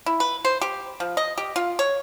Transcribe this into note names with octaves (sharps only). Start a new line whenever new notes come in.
E4
B4
C5
G4
F3
D#5
G4
F4
C#5